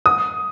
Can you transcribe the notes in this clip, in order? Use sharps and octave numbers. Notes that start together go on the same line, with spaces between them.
D#6